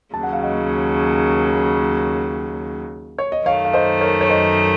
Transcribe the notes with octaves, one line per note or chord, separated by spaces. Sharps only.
D#2 C#3 F#3 A5
F#5
F5
D#5 F#5
C#5
D#5
F#2 D#3 A3 C#5 F5
F5
C5 D#5
A#4 C#5
C#5
C5 D#5